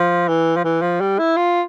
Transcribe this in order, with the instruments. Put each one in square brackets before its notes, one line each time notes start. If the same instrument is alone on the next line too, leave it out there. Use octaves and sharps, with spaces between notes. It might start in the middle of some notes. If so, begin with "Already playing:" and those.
Already playing: [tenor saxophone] F3
E3
F3
E3
F3
G3
E4
F4